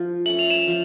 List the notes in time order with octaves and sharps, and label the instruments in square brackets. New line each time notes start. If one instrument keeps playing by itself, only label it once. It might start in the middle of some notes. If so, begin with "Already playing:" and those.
Already playing: [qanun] F3
[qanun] A3 C#4 [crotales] F#7
[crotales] F7
E7 F#7
[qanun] F3